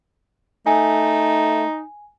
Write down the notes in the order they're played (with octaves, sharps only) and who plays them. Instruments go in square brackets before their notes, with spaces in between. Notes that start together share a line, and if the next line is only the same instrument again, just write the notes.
[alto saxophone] A3 [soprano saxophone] D#4 [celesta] G#5